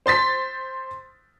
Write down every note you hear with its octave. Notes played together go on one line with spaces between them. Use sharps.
C5 C6 A6 B6